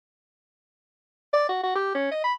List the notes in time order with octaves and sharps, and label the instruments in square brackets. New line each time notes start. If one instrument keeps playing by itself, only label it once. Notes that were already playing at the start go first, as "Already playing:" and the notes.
[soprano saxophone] D5
F#4
F#4
G4
C#4
D#5
B5